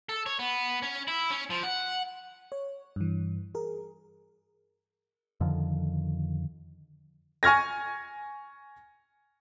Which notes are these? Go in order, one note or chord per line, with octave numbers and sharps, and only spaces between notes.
A4
C#5
B3
C#4
E4
C#4
F3
F#5
C#5
G2 E3
G#4 A#4
F2 D3 D#3 F3
G#5 C#6 F6 G#6 A#6